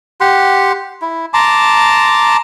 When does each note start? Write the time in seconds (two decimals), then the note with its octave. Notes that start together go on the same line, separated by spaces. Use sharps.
0.21 G4 F#5 C6
1.02 E4
1.34 A5 A#5 C6 D6